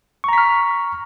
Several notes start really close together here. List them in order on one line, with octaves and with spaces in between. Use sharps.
C#6 A#5 B6 F6